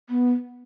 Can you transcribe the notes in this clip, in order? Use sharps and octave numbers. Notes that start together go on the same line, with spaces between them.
B3